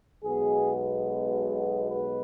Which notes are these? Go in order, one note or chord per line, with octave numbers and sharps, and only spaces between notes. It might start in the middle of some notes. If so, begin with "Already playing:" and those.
B1 B2 G#3 B3 G#4
B4